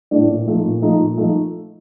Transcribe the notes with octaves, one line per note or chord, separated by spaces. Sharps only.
A2 A3 D4
A#2
F3 A3 D#4
A#2
F3 A3 D#4
A#2
F3 A3 D#4